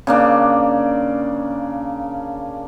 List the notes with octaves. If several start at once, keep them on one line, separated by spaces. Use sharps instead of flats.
C#3 A#3 D4